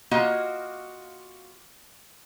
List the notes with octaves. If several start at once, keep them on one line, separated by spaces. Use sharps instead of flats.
A#3 F4 F#4 D#5